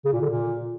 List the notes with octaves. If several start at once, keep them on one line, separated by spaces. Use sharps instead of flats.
C#3
A#2
D3
A#2